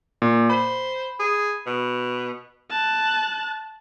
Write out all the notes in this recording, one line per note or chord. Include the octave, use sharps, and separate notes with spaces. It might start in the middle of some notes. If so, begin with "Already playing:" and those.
A#2
C5 B5
G#4
B2
A5 F#6